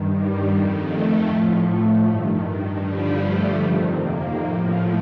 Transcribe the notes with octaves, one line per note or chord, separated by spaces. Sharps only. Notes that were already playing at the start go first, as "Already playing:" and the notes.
Already playing: G2 D#3
G3
F2 D#3
A3
A2 F3
A3
G2 D#3
G2 D3 F3 G3
A3
F2 C3 D#3
A#3
A2 F3